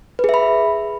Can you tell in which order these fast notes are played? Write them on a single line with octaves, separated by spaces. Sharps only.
B4 G#4 E5 B5